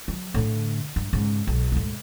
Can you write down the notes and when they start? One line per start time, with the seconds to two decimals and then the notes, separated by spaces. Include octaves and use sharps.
0.08 F#3
0.34 A2 D3
0.96 G2
1.13 G#2 C#3
1.47 B1
1.72 D2 G#2